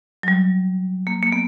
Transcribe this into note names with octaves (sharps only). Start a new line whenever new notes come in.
F#3
G3
A#3
A#3
B3